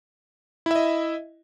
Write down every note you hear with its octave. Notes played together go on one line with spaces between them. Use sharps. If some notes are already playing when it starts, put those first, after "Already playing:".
E4 D#5 E5